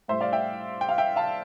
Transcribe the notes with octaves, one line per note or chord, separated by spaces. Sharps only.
A2 G3 C5 E5
D5 F5
E5 G5
G5
F5
E5 G5
F5 A5